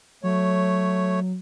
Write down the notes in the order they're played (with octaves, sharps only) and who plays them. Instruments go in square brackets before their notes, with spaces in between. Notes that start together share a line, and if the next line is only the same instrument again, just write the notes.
[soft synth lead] F#3 [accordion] A3 C#5